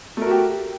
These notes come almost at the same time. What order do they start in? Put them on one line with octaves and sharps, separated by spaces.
A3 A#4 F#4 G4